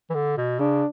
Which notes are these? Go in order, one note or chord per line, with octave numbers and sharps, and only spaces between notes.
E3
D3
B2
C#3 D4